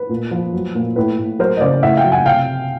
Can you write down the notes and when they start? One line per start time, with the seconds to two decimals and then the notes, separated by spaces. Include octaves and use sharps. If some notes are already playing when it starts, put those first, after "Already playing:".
Already playing: B4
0.09 A#2
0.31 F3
0.53 F#3
0.75 A#2
0.96 A2 B4
1.18 A2
1.39 F#3 A#4 C5
1.57 D#5
1.61 C#3 C5 D5
1.82 A2 E5 F#5
1.97 F5 G5
2.04 F#3
2.12 F#5 G#5
2.26 C3 F5 G5